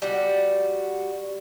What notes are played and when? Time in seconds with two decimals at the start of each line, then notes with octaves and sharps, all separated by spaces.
0.02 G3 F#4